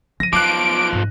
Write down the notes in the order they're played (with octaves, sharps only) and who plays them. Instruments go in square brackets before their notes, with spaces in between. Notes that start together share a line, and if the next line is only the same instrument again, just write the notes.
[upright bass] F3 [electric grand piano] A#6 D#7
[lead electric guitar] B1 F3 [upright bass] B3 [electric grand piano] D6 F#6 [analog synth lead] D7
[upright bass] G#2